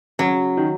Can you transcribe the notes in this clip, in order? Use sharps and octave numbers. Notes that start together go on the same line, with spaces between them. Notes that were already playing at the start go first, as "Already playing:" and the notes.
C#3 F#3
D#3